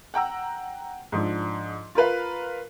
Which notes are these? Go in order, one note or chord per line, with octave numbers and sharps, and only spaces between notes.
F#5 G5 A#5 E6
G#2 F3 D4
F4 A#4 B4 F5